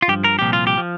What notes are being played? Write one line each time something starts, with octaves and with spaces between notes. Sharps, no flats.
F4
G2 F3 G4
A#4
C2 A#2 F3 G4
F4
G4
F3